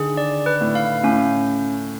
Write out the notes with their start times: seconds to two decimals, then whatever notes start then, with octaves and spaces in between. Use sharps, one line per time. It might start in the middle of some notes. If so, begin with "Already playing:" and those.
Already playing: D3 D#3 G#4
0.17 D5
0.46 B4
0.61 A2
0.75 F5
1.03 A2 C#4